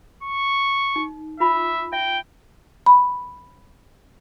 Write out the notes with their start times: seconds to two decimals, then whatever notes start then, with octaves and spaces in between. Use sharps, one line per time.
0.23 C#6
0.96 D#4
1.40 F4 E5 B5
1.93 E5 G5
2.86 B5